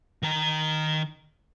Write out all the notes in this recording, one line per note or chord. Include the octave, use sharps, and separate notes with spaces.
D#3 A#5